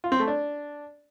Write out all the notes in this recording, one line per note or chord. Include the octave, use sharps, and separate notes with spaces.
F4
C4
A3
D4